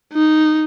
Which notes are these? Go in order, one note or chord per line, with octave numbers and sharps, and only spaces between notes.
D#4